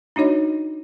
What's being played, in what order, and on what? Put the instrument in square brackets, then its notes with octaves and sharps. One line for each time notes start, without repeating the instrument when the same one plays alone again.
[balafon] D4 D#4 F#4 C#5 D#5